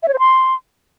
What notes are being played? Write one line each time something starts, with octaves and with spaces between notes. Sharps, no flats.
E5
C#5
C5
C6